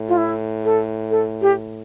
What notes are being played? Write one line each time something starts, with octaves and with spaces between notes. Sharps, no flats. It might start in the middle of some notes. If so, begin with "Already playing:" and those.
Already playing: A2
F4
E4
A4
A4
G4